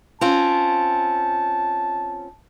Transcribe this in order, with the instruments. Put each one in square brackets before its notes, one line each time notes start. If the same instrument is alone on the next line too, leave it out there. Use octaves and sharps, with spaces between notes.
[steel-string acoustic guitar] C4 C#4 F4 [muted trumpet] A5